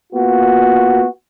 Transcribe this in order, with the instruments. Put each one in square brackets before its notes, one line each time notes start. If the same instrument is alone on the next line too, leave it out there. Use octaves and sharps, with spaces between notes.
[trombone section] A#3 B3 F4 F#4